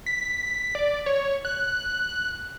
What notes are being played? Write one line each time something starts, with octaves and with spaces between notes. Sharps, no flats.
B6
D5
C#5
F#6